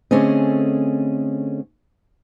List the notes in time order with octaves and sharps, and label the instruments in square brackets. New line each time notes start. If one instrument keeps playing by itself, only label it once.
[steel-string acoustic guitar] D3 A3 C4 C#4 G#4 D#5